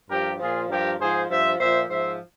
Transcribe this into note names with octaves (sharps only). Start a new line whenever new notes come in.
G2 F3 G4 A#4
A#2 F3 F4 G#4
G2 F3 G4 A#4
G#2 F3 G#4 C5
G2 F3 C5 E5
A#2 F3 C5 E5
G#2 F3 C5 E5